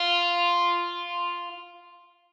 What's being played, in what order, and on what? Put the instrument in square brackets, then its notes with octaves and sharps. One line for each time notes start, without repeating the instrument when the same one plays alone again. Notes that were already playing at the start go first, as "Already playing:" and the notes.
Already playing: [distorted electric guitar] F4